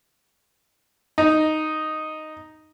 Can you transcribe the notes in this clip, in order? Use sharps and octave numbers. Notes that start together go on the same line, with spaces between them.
D#4